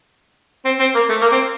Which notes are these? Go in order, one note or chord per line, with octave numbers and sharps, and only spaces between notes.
C4
C4
A#3
A3
A#3
C4